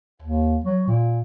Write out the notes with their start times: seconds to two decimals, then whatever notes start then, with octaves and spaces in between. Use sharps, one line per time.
0.22 D#2
0.64 F#3
0.88 A#2